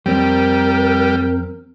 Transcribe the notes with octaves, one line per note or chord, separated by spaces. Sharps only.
F2 G3 C4 A#4